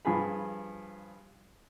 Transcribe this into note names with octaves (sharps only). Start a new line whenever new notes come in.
G2 F3 F4 G#4 B5